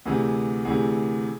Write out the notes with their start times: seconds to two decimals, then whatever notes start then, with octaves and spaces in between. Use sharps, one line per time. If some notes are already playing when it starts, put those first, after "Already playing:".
0.05 D2 C3 E3 G#4
0.65 D2 C3 E3 G#4